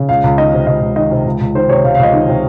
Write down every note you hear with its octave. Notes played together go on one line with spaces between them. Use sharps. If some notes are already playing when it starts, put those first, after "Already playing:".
Already playing: C#3
C#2 F5
C#2
D#3 D#5
C3
C#2 D#5
C#2
D#3 D#5
C3
C#2
C#2
D#3 C5
C3 C#5
C#2 F5
F5
C#2 D#5
D#3
C3